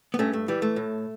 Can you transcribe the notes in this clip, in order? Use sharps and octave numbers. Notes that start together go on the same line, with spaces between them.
B3
G2 A3 C#4
A3
E3 G3
A3
A2